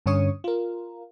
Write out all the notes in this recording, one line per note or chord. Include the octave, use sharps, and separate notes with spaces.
G2 D3 C#4 C#5 C#6 D#6
F4 A#4